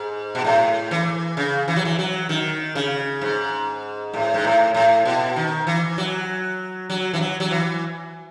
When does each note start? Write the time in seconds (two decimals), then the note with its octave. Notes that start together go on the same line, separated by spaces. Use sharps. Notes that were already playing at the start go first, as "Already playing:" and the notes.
Already playing: G#2
0.35 B2
0.44 A2
0.91 E3
1.37 C#3
1.68 E3
1.76 F#3
1.85 E3
1.99 F#3
2.29 D#3
2.75 C#3
3.21 G#2
4.14 A2
4.34 G#2
4.44 A2
4.75 A2
5.05 B2
5.36 D#3
5.67 E3
5.98 F#3
6.90 F#3
7.14 E3
7.21 F#3
7.40 F#3
7.51 E3